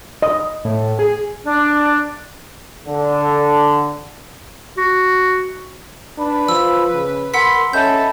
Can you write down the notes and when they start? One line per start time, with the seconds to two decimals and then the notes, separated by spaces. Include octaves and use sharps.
0.22 D#5
0.64 A2
0.99 G#4
1.44 D4
2.86 D3
4.77 F#4
6.18 D4 B4 B5
6.48 F3 E6
6.94 C#3
7.34 A#4 F#5 B5 C6 E6 B6
7.73 C#4 A4 D#5 E5 B5 G6